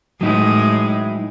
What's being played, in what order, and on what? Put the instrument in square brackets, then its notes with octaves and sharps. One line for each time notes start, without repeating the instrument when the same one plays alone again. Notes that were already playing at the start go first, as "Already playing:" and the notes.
[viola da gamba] A2 G#3 [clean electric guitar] F#3 D#4 E4